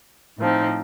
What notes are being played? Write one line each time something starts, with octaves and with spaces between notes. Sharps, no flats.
A2 F3 C4 D#4